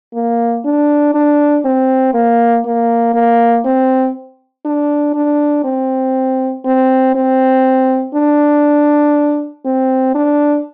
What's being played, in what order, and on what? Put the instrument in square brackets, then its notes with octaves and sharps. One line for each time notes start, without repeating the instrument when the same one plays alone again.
[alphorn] A#3
D4
D4
C4
A#3
A#3
A#3
C4
D4
D4
C4
C4
C4
D4
C4
D4